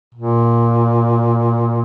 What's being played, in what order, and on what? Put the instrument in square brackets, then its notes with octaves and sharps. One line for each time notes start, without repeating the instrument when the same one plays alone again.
[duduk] A#2